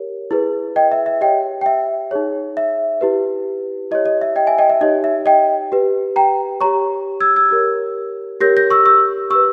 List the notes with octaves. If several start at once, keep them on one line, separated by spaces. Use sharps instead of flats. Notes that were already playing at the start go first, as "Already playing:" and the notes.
Already playing: G4 A#4 C#5
E4 G#4 B4
D#5 G5
E5
E5
G4 C#5 D#5 G5
G5
E5
D#4 G#4 C#5
E5
E4 G4 B4
E4 G4 C#5 D#5
D#5
E5
D#5 G5
E5 G#5
D#5 G5
E5
D#4 G4 C#5 D#5
E5
D#5 G5
G4 B4
G5 A#5
G4 C#5 A#5 C#6
E6 G#6
E6 G#6
G4 A#4 C#5
G4 A#4 C#5 G6 A#6
G6 A#6
C#6 E6
C#6 E6
G4 B4 C#6 E6